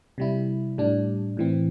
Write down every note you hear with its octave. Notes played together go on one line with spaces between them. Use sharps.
C3 G3 E4
A2 G3 D4
A2 E3 C4